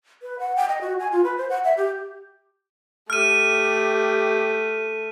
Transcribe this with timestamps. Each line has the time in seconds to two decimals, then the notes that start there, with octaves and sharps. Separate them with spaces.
0.22 B4
0.39 F#5
0.56 G5
0.69 D#5
0.81 F#4
1.00 G#5
1.12 F4
1.24 B4
1.37 C5
1.50 F#5
1.64 E5
1.77 G4
3.10 A3 G4 F6 D#7